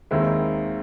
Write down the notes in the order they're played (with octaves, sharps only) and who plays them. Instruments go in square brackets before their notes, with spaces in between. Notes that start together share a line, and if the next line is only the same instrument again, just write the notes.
[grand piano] D#2 D#3 G#3 C4 E4